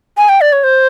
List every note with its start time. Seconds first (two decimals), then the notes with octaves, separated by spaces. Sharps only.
0.17 G#5
0.29 G5
0.41 D5
0.53 C#5
0.64 C5